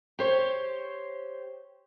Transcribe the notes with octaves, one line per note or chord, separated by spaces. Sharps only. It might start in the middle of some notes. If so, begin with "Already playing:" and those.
G4 C5 C#5